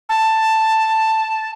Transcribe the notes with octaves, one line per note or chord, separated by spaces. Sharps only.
A5